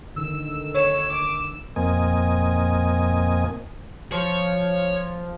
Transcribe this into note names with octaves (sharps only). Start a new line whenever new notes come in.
D3 D#3 E6
C#5 E6
D6
F2 A#2 A#3 C4 D#5 G#5
F3 C#5